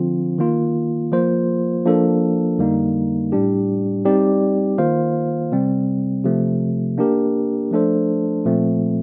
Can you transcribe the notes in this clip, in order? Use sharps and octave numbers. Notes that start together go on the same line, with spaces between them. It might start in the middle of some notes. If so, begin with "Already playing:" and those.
Already playing: D3 F3 C4 F4
D#3 A#3 F4
F3 A#3 F4 C5
F3 A#3 D4 A4
F2 D3 G3 A#3 D#4
A2 G3 D4 G4
G3 C4 D#4 G4 D5
D#3 A#3 F4 C5 F5
C3 G3 C4
C3 F3 A3
A#3 D4 G4 A#4
F3 A3 D4 A4 C5
A#2 F3 A3 C4